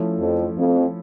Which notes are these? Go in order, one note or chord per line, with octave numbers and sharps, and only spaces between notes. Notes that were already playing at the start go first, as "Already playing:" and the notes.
Already playing: F3 A3 C#4 E4
F2
F2